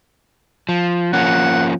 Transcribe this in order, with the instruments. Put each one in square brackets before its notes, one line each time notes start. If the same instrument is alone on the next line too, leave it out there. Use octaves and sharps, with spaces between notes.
[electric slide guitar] F3
[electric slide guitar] F3 A#3 C#4 [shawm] F#5